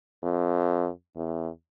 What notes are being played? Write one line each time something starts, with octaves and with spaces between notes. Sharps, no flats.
F2
E2